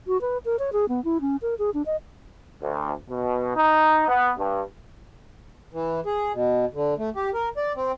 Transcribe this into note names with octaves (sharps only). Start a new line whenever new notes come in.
F#4
B4
A#4
C#5
G#4
B3
E4
C#4
A#4
G#4
D4
D#5
D2
B2
D#4
B3
G2
E3
G#4
B2
D3
A3
G4
A#4
D5
C4